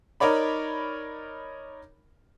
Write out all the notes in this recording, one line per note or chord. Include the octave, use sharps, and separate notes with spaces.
D#4 A#4 C#5 D5 B5